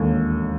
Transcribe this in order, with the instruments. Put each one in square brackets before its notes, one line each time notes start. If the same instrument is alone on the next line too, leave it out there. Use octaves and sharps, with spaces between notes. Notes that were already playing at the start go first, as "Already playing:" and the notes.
Already playing: [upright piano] E1 D#2 A4